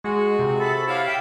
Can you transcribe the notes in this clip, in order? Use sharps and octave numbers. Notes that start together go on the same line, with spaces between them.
G#3 F#4 G#4
C3
A4 B5
E4 C#5 F5 F#5 D6
E5 G5